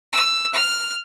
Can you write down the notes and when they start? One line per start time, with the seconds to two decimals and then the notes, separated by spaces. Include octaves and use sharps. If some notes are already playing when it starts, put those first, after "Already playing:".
0.13 E6
0.53 F6